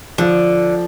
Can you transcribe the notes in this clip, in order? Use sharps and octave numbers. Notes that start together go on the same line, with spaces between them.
D3 F3